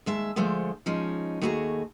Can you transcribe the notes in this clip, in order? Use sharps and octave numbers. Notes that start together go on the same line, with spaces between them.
D#2 G#3 E5 A5
D3 F3 G#3 A3 C5
F3 G#3 C#4 D#4
D#2 A3 F#4 G#4 A5 A#5